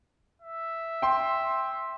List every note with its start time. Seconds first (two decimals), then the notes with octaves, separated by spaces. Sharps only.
0.42 E5
1.02 G5 C6